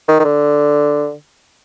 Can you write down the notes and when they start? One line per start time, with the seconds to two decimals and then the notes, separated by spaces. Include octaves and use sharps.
0.08 D#3
0.20 D#3
0.24 D3